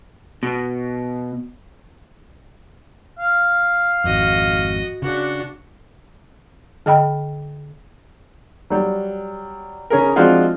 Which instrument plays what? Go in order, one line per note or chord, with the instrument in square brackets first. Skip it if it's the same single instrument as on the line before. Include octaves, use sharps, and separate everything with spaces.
[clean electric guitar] B2
[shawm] F5
[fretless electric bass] G#1 F2 [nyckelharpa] F#4 D#5
[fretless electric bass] C#3 [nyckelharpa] D4 F#4
[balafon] D3 D#5 G5 B5
[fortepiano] F#3 G3
C#3 C#4 G#4 A#4
F3 G#3 C4 D4 F4 F#4